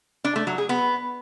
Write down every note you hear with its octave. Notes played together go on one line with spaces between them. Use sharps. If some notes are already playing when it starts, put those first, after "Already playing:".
D4
A3
F#3
G#4
B3